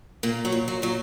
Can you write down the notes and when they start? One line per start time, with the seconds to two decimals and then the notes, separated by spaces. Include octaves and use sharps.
0.23 A#2 A#3
0.45 F#3
0.52 A#2
0.68 F#3
0.82 A#2 F#3